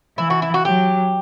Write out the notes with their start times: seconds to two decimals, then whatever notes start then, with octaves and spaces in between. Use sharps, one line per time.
0.18 E3 E4
0.30 F#4
0.42 E4
0.54 F#4
0.65 F#3 G4